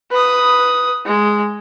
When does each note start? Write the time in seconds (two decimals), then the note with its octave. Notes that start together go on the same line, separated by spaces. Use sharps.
0.11 B4 D#6
1.06 G#3